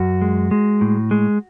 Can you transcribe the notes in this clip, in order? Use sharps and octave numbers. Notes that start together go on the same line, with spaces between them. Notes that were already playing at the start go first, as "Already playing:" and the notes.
Already playing: F#2 F#4
G#3
G#3
A2
G#3